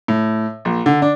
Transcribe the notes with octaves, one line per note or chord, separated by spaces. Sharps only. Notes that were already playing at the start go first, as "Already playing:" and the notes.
A2
A#1
D3
D4